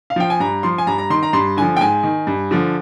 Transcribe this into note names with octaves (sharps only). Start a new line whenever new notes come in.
F5
F3 G5
G#5
G2 A#5
F3 C6
G#5
G2 A#5
A#5
D#3 C6
A#5
G2 C6
D3 F3 G#5
G5
G#2 G#5
D#3
G2
D3 F3